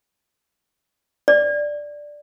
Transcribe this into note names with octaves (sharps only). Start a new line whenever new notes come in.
D5